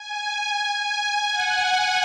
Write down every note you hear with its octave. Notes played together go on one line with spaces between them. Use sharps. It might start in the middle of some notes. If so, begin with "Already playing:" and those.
Already playing: G#5
G#5
G#5
F#5